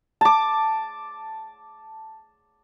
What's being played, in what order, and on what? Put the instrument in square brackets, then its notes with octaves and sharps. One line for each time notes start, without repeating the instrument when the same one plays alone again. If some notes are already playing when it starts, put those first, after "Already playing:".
[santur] A5 D6